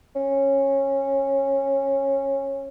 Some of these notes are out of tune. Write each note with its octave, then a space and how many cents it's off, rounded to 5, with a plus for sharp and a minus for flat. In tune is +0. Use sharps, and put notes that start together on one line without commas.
C#4 -20